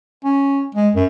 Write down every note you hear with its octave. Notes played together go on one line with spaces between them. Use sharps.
C#4
G#3
F#2